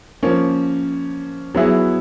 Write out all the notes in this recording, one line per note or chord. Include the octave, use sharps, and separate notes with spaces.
F3 A#3 C#4
F#3 B3 E4 G#4